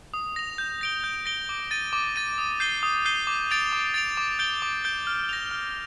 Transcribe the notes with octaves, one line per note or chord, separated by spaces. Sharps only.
D#6
A#6 F7
G6
A#6 D7 G7
G6
A#6 D7 G7
D6
A6 D#7
D6
A6 D#7
D#6
G6 C7 D#7 G7
D#6
G6 C7 D#7 G7
D6
A6 D7 F7
D6
A6 D7 F7
D6
G6 D7 G7
D6
G6 D7 G7
F6
A#6 F7
F6